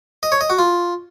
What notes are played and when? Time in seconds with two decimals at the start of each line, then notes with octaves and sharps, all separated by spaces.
0.23 D#5
0.32 C#5
0.41 D#5
0.50 F#4
0.59 F4